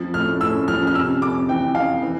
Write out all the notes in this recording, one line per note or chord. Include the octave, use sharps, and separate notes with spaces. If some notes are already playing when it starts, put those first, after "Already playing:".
Already playing: F2 F3
A2 F6
A2 E6
F3 F6
F6
C3 E6
F2 D6
E3 G5
F2 F5
E3